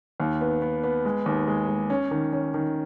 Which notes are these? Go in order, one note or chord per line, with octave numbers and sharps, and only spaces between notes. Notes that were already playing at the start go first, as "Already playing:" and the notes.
D#2
B3
B3
B3
G#3
D#2
G#3
G#3
C#4
D#3
C#4
D#3